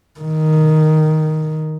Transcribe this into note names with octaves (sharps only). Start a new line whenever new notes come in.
D#3